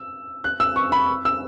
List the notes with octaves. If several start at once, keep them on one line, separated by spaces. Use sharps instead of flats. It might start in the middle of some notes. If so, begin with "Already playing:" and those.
Already playing: E6
F#6
E6
C#6
B5
E6